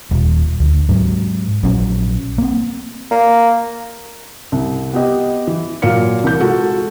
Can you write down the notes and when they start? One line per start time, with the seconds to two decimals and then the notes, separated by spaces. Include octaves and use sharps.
0.11 D#1
0.60 D2
0.89 G#2 F#3
1.63 A#1 F#3 C#4
2.38 A#3 C4
3.11 A#3
4.52 C2
4.93 B3 G4 D#5
5.47 E3
5.82 A#2 F#3 A#4 F5 C#7
6.24 C2 E3 A#4 G6
6.40 G#3 F4 F#4 A4